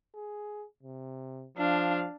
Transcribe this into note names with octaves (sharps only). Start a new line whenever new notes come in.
G#4
C3
F3 D4 F5